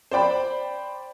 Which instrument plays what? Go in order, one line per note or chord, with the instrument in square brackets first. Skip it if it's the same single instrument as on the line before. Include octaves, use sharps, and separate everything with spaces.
[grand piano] C5 D5 G5 B5